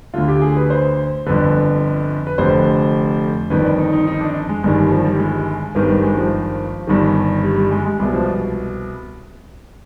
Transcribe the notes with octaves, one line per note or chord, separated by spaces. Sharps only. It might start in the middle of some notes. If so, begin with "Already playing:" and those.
D2 D3 F4
G4
G#4
B4
C5
G1 F2 D3 B4
B4
F1 F2 D3 C5
G1 F2 D#3 B4
D5
D#4
D#4
D#4
D4
G#3
G1 G2 D#3 G#3
G3
F3
G3
G#3
G#1 G2 D#3 B3
G3
G#3
F3
G1 G2 D#3
G3
G3
G#3
G#3
C2 B2 G#3
F3